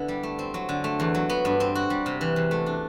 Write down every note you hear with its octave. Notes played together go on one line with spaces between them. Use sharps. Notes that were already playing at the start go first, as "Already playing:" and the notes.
Already playing: D3 B3 E4
G3
A3
C4
F#3
D3
A3
E2
F#3
B3
G2
C4
F#4
G3
C3
E3
E2
A3
D4